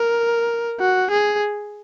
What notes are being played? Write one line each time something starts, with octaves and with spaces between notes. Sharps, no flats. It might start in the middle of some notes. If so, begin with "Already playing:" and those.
Already playing: A#4
F#4
G#4